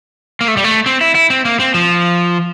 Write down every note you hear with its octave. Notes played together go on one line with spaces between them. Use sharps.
A#3
A3
G3
A3
C4
E4
E4
C4
A#3
C4
F3